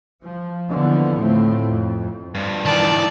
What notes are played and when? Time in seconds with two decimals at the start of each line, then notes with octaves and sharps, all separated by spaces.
0.24 F3
0.70 D#2 D3 E3 F3 B3
1.20 A2 F3 A3 C4
1.69 F2
2.35 G2 F3
2.66 D#3 E3 D5 A5